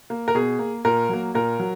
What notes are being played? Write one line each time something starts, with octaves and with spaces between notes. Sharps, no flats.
A#3
A#4
B2 G#4
A#3
A#2 A#4
F#3 A#3
A#2 A#4
F#3